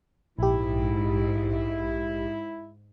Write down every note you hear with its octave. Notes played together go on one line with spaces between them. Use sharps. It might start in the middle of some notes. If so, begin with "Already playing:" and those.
A#1 G#2 E4 G4